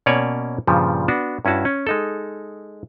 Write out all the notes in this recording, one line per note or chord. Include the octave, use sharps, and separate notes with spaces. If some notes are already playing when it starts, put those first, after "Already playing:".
B2 A#3 C#4 C#5 D5 G#5
G2 A#2 C#3 F3 G3
B3 D4 F#4
G2 C#4 E4 F#4 A5
C#4
G#3 D#4 A4